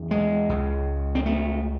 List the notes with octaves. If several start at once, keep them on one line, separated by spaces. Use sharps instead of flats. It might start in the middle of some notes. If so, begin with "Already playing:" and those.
Already playing: E2 C#3
G#3
C#2 C#3
C4
A3